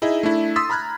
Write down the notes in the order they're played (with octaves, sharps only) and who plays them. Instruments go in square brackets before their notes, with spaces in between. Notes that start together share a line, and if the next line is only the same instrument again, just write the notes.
[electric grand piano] D#4 E4 G#4 D#5 E5
A3 D4 E4
C6 D#6 E6 A6 B6
A#5 B5 F6 F#6 G#6